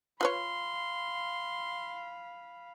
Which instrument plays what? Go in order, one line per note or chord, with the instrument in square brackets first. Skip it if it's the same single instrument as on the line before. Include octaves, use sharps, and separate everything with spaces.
[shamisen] F4 B4 C#5 [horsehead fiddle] F5 B5 [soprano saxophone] C6